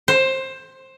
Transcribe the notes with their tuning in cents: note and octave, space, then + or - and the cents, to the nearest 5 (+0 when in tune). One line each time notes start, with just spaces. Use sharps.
C5 +15